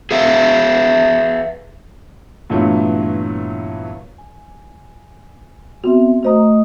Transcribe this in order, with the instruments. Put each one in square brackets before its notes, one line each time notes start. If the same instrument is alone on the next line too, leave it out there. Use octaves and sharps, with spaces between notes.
[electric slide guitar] G#4 B4 E5 F5
[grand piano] G2 A#2 E3 F#3 A3 B3
[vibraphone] G#5
[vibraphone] B3 C4 E5 [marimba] F#4
[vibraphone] A3 D#5 D#6 [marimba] F#4 C5 A#5